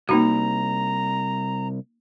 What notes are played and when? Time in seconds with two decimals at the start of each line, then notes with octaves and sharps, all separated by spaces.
0.09 C2 A#3 D#4 F#4 A#5